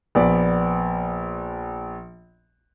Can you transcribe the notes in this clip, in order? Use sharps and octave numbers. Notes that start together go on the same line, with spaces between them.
A#1 B3 D5